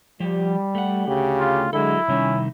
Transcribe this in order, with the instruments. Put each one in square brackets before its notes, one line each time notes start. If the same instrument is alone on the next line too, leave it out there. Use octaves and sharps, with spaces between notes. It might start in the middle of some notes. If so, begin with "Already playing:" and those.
[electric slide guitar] F3 G4 [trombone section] G3
[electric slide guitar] A3 F#5
[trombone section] D2 C#3 G4
[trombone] F4
[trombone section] D3 G#3 [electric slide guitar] F#3 A4 [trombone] E4
[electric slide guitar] C3 D#3 G3 [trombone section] C#4